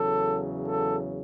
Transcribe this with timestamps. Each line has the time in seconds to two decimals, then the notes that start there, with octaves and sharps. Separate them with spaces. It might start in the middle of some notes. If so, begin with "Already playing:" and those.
Already playing: E2 C#3 F#3 A4
0.66 A4